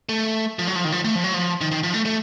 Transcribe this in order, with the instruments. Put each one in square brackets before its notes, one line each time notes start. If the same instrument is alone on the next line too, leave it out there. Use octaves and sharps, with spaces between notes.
[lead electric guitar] A3
F3
F#3
F3
D#3
F3
A3
F3
F#3
F3
D#3
D#3
F3
A3
A3